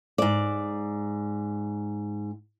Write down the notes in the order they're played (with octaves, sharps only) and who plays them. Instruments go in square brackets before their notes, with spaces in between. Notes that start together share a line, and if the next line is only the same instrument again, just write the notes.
[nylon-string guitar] G#2 D5